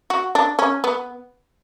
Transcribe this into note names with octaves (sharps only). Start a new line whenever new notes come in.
F#4
D4
C#4
B3